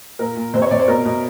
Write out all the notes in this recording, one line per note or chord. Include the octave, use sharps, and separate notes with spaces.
A#2 A#4
A#2
C3 C5
C#5
C3 D5
C5
B2 A#4
B2